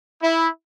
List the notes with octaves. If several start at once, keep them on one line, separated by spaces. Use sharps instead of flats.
E4